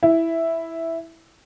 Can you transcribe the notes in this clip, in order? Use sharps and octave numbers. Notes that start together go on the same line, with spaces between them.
E4